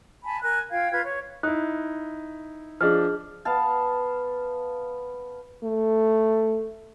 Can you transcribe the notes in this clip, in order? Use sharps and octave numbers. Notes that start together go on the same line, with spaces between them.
G#5 A5 B5
A#4 G#5 F#6
F4 F5 G5 G#6
F4 B4 G#6
C#5 C#6
D#4 E4 F#6
F3 D4 G#4 D#5 F6
B3 F5 A5
A3